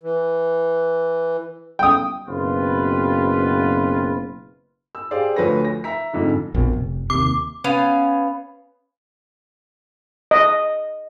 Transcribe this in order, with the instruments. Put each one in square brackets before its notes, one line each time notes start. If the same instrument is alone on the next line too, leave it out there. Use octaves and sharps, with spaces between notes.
[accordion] E3
[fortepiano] G5 D#6
[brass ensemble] F#1 B2 C4 F4 B4
[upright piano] E6
G4 G#4 C5 D5 F5
D2 F3 B4 C#5 A#6
A#6
E5 A#5 B6
F2 G#2 D3
[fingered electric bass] A#1 F2 B2
F1
[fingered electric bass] D#2 C3 [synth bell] D6
[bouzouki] B3 C#4 F5
[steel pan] D#5